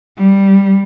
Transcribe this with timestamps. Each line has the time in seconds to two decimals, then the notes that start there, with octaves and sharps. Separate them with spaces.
0.18 G3